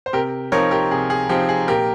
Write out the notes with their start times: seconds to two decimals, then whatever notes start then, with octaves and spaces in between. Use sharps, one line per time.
0.06 C5
0.13 C3 G4 A#4
0.52 F3 C4 D#4 A#4 C#5
0.71 G4 A#4
0.91 C3 G#4
1.10 G#4
1.29 F3 C4 D#4 G4
1.49 G#4
1.67 A#2 G4 A#4